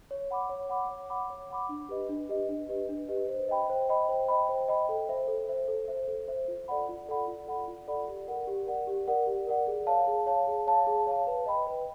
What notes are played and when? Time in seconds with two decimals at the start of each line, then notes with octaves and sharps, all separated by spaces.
0.11 C#5
0.31 F#5 B5 D6
0.49 C#5
0.69 F#5 B5 D6
0.89 C#5
1.10 F#5 B5 D6
1.30 C#5
1.50 F#5 B5 D6
1.69 D4
1.89 G4 B4 D#5
2.09 D4
2.29 G4 B4 D#5
2.49 D4
2.69 G4 B4 D#5
2.89 D4
3.09 G4 B4 D#5
3.28 C5
3.49 D#5 G5 B5
3.70 C5
3.89 D#5 G5 B5
4.09 C5
4.28 D#5 G5 B5
4.49 C5
4.68 D#5 G5 B5
4.89 A4
5.09 C5 E5
5.28 A4
5.49 C5 E5
5.68 A4
5.88 C5 E5
6.08 A4
6.28 C5 E5
6.48 F4
6.68 A4 D5 F#5 B5
6.89 F4
7.08 A4 D5 F#5 B5
7.28 F4
7.47 A4 D5 F#5 B5
7.68 F4
7.87 A4 D5 F#5 B5
8.08 G4
8.28 A#4 D5 F#5
8.47 G4
8.67 A#4 D5 F#5
8.87 G4
9.08 A#4 D5 F#5
9.27 G4
9.47 A#4 D5 F#5
9.67 G#4
9.87 C#5 F5 A5
10.07 G#4
10.26 C#5 F5 A5
10.47 G#4
10.67 C#5 F5 A5
10.87 G#4
11.07 C#5 F5 A5
11.27 B4
11.46 D#5 G5 B5
11.67 B4